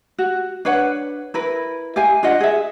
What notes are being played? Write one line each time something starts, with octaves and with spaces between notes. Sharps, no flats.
F#4
D4 B4 C#5 F#5
E4 A#4 B4
G4 E5 F5 G#5
D4 F4 D#5 F#5
G#4 E5